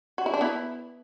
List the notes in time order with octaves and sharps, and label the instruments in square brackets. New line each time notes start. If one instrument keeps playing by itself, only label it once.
[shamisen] F#4
E4
D4
B3 E4